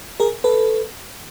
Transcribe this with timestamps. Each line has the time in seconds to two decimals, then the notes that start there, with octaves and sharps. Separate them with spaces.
0.20 G#4 A#4
0.44 A4 B4